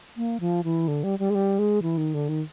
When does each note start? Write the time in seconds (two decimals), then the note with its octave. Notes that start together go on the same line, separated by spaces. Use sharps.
0.17 A#3
0.40 F3
0.64 E3
0.88 D3
1.04 G3
1.19 G3
1.30 G#3
1.35 G3
1.59 G#3
1.82 E3
1.98 D#3
2.14 D3
2.29 D#3